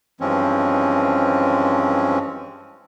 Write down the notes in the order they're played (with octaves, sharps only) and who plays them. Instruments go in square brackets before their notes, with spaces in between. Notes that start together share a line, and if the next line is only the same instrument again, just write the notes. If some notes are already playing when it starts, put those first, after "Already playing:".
[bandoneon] G2 E3 F3 G#3 C4 C#4